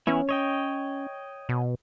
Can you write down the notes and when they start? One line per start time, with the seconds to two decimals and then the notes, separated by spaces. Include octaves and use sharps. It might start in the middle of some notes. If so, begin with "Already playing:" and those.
0.07 E3 B3 C#4 E4
0.29 C#5 D#5 G5
1.49 B2